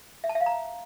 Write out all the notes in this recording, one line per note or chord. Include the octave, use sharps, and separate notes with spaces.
E5
A5
E5
F5
A#5